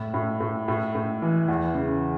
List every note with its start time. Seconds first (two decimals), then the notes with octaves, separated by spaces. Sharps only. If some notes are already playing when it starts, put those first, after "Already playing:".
Already playing: A2
0.14 A2
0.41 A2
0.68 A2
0.95 A2
1.22 E3
1.48 E2
1.75 C#3